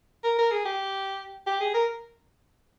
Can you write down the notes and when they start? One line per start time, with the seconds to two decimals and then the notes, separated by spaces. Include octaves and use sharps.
0.24 A#4
0.39 A#4
0.52 G#4
0.65 G4
1.47 G4
1.60 G#4
1.74 A#4